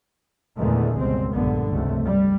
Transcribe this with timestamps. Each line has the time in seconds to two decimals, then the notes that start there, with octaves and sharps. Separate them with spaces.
0.58 E2 A#2 D3 D#3 G#3 A3
0.97 G1 C#2 G2 B2 C4
1.32 A#1 G2 A#2 D3 B3
1.70 F1 C#2 C3 A3
2.05 G3